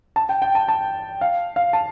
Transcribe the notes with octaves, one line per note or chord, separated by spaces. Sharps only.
A5
G5
G5
A5
A5
F5
F5
A5